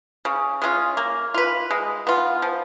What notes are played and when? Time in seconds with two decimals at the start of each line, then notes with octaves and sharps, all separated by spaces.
0.25 C#3
0.62 G#3 C#4 F4
0.97 A#3
1.34 F4 B4
1.71 G#3
2.07 B3 F4
2.42 F3